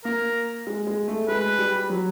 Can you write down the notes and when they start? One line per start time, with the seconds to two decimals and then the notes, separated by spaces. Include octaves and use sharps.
0.04 A#3 A#4
0.67 G#3
0.87 G#3
1.08 A3
1.28 G#3 B4
1.59 G3
1.90 F#3